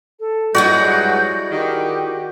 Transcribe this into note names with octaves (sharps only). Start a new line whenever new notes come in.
A4
G2 F#3 G#3 E4 F#4 G#4 D5 G6
D#3 G4